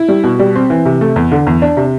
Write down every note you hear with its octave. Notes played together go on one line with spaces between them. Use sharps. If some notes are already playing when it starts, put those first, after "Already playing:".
Already playing: E4
G3
B2
G3
C4
E3
C3
A3
E2
D3
E2
D4
C3